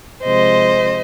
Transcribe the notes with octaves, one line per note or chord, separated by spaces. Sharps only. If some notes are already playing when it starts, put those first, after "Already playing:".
C3 F3 G#3 C5 D#5